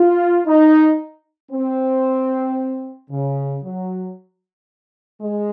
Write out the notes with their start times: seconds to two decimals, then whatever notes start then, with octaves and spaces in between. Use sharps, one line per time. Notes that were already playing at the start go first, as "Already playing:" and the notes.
Already playing: F4
0.46 D#4
1.52 C4
3.11 C#3
3.63 F#3
5.21 G#3